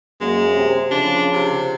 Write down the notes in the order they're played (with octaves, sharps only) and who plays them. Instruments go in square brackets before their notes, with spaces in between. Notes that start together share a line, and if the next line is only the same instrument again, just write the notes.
[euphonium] F#2 [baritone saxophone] G#3 [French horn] A#3
[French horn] C3
[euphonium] C#3 [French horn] F3 [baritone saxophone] D4
[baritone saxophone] C3